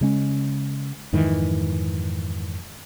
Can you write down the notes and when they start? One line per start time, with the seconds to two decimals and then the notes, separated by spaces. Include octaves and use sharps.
0.01 C#3 G#3 C#4
1.13 F2 G#2 D#3 E3